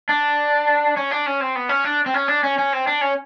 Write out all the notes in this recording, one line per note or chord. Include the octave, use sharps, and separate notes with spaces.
D4
C#4
D4
C#4
C4
B3
C#4
D4
C4
C#4
D4
C#4
C#4
C4
D4
C#4